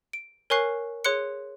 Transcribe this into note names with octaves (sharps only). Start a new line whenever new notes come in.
D7
A#4 C#5 G#5 C#6 F#6 C7
G#4 C#5 C6 F#6 C#7